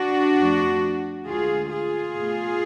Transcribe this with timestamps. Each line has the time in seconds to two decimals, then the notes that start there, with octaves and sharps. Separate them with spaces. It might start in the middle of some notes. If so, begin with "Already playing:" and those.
Already playing: D4 F#4
0.37 F2 F3 A3
1.26 D2 D3 G#3 F4 G#4
1.70 F4 G#4
2.14 B2 A3